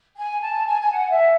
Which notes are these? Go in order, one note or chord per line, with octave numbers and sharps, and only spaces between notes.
G#5
A5
G#5
G#5
F#5
E5